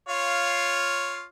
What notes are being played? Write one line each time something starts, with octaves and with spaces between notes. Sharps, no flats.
F4 C#5 F5